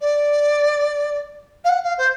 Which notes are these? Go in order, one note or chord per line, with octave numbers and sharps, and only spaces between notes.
D5
F5
F#5
F5
C5